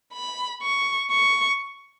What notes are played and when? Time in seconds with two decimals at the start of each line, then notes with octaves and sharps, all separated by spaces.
0.13 B5
0.62 C#6
1.11 C#6